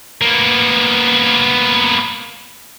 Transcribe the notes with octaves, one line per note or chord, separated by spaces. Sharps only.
A#3 B3